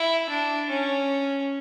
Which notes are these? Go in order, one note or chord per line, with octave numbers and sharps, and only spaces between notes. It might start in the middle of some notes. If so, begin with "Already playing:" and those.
Already playing: E4
D4
C#4